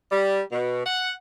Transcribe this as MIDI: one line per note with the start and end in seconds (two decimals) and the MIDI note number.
0.11 0.41 55
0.51 0.82 47
0.86 1.12 78